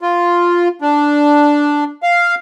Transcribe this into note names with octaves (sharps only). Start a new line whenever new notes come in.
F4
D4
F5